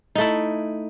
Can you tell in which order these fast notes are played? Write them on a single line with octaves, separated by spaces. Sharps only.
D#4 A3 E4